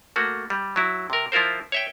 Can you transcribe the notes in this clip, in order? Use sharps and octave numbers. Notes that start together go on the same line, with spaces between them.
A3 A#3 F#4
G3
F#3 E4
C3 A#4
F3 E4 F4 A#4 C5
C#5 E5 G5